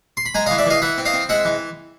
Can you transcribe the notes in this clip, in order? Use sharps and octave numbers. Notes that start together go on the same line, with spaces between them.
C6
B5
G#3 G#5 A#5
D#5 F5
E3
D5 E5
E3 D#5 F5
E3 E5 F#5
C4
D#5 F5
C4
G#3 E5 F#5
E3